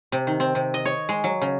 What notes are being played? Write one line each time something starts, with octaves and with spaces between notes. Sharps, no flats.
C3
D#3
C4
C3
D#5
C#5
G#3
F#3
C#3